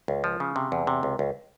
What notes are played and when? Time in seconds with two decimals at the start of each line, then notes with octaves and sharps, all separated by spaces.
0.08 C#2
0.24 F3
0.40 C#3
0.56 C3
0.72 E2
0.87 C3
1.03 C#2
1.19 C#2